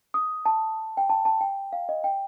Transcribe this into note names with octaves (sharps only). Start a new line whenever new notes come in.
D#6
A5
G5
A5
A5
G5
F5
D#5
G5